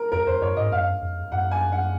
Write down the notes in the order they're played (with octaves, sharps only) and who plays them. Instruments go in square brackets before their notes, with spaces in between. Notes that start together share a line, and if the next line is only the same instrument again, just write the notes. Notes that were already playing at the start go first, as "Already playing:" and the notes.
Already playing: [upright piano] A#4
[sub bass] F2 [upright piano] A#4
[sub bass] F2 [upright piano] C5
[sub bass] F#2 [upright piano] C#5
[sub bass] G#2 [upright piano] D#5
[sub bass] F#2 [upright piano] F5
[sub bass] F2
[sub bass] F#2 [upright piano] F#5
[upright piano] G#5
F#5